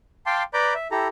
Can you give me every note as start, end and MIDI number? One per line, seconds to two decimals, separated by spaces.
0.26 0.43 77
0.26 0.43 79
0.26 0.43 81
0.26 0.43 84
0.26 0.43 86
0.54 0.74 71
0.54 0.74 74
0.54 0.74 82
0.54 0.74 83
0.54 0.74 86
0.54 0.74 91
0.74 0.88 76
0.91 1.08 64
0.91 1.08 67
0.91 1.08 69
0.91 1.08 82